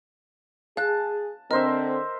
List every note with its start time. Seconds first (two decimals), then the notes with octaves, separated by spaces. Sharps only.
0.77 G#4 F5 A5 F#6
1.51 D3 C4 A#4 C5 D#5 E5